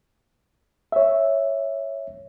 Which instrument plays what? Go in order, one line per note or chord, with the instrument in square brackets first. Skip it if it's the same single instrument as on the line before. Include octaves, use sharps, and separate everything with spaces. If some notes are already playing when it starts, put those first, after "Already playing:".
[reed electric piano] C#5 E5